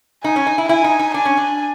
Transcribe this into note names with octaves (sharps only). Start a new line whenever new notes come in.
D#4 G#5
C#4
D#4
E4
E4 G#5
D#4
D#4
D4 G#5
C#4
D4